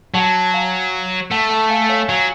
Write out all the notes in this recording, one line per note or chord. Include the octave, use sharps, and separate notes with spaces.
F#3 F#5 A5
F5 G#5
A3 F#5 A5
F#5 A5
F5 G#5
C#5 F5
F#3 F5 G#5